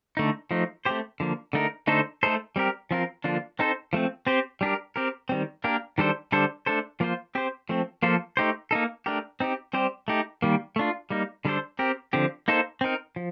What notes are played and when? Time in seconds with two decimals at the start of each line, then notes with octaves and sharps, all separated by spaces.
0.17 D3 A3 D#4
0.51 F3 A3 D#4
0.85 A3 C4 G4 C5
1.20 D3 F3 A#3
1.53 D3 A3 D#4 A#4
1.87 D3 A3 D#4 A4 C5
2.23 A3 D#4 A4 C5
2.56 G3 C4 G4 A#4
2.91 F3 C4 F4 A#4
3.24 D3 F3 A#3 D4 F4
3.59 C4 D#4 A4 C5
3.93 F3 A3 C4
4.27 C4 G4 C5
4.61 G3 D4 G4 A#4
4.96 C4 G4 A#4
5.29 D#3 G3 C4
5.64 A#3 D4 G4 A#4
5.98 D#3 G3 D4 A4 C5
6.32 D3 G3 D4 A4 C5
6.66 A3 D4 A4 C5
7.00 F3 A#3 F4 C5
7.35 C4 G4 C5
7.69 F3 A3 C4
8.03 F3 A#3 F4 A4 C5
8.37 A3 D#4 G4 C5
8.71 A#3 D#4 A4
9.06 A3 D4 G4 A#4
9.40 C4 D#4 G4
9.73 G3 C4 G4 C5
10.08 A3 D#4 G4
10.42 D#3 G3 A#3
10.76 A3 D4 F4
11.10 G3 A#3 D#4
11.45 D3 G3 D4 A4 C5
11.79 C4 G4 A#4
12.13 D3 F3 C4 G4
12.48 A#3 D#4 A4 C5
12.81 C4 D#4 A#4
13.16 F3